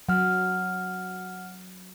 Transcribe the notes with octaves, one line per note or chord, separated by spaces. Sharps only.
F#3 F#5 F6